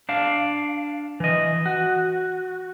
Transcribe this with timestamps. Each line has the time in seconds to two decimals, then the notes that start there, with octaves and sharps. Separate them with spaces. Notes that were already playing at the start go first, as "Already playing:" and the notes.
0.09 D4 F5
1.20 E3 D#5
1.66 F#4